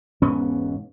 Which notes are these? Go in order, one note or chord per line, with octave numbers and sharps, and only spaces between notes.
E1 G#2 B3 C#4